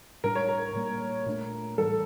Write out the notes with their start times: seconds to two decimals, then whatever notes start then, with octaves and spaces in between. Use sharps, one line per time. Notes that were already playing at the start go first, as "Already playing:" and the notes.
0.24 A2 G3 D4 A#4
0.35 C#5
0.49 A#4
0.74 A#2 G3 A#3
1.26 A#2 A3 D4
1.78 A2 E3 G3 A4